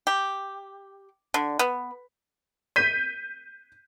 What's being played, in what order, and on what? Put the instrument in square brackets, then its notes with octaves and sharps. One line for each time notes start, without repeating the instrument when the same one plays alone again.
[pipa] G4
D3
B3
[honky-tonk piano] G6 B6 D#7